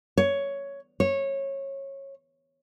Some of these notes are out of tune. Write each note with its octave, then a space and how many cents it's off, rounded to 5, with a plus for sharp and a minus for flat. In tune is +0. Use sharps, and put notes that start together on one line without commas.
C#5 +10
C#5 -20